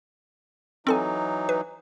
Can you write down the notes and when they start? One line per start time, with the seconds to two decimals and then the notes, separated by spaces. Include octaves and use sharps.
0.87 E3 F#3 C4 D#4 A4 G#5
1.49 B4